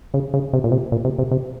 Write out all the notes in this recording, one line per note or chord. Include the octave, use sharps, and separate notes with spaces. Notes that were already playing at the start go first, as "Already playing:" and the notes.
C#3
C#3
C3
A#2
C3
A#2
C3
C3
C3